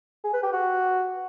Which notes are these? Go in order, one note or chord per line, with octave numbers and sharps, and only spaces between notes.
G#4
B4
G4
F#4